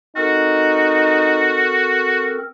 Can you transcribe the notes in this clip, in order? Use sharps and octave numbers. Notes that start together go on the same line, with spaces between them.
C4 D#4 F#4 A4 A#4